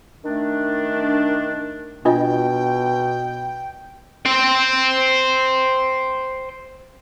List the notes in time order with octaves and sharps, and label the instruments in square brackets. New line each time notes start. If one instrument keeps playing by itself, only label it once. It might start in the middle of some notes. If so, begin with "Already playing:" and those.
[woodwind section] D#3 A3 D4
[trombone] B2 [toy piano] D4 F4 D#5 [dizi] G5
[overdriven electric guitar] C5 G5